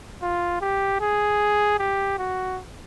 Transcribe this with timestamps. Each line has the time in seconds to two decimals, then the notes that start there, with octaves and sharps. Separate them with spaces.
0.22 F4
0.61 G4
1.01 G#4
1.79 G4
2.19 F#4